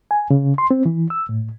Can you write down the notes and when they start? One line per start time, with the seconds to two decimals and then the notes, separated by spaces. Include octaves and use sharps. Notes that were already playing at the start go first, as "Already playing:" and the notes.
0.11 G#5
0.31 C#3
0.58 C6
0.71 C4
0.86 E3
1.10 E6
1.29 A2